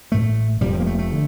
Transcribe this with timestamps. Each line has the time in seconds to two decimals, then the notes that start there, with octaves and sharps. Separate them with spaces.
0.11 A1 A2 A3
0.61 F1 F2 C3 G3
0.73 F3
0.80 A#3
0.86 A3
0.99 A3
1.12 D3